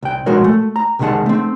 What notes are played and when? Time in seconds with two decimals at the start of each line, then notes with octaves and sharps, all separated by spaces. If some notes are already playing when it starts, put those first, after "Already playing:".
0.02 C2 G5
0.26 B1 F3 G#3 F#4 A#4 C#5
0.44 A3
0.76 A#5
0.99 C2 C3 D#3 G#3 F#5 A5
1.26 A3 C4